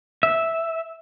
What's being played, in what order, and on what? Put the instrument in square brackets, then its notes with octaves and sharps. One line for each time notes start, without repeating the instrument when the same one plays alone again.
[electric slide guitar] E5